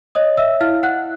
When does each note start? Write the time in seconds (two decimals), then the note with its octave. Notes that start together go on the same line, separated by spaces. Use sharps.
0.15 C#5 D#5 D#6
0.37 E5 E6
0.60 E4 F5 F6
0.83 F#5 F#6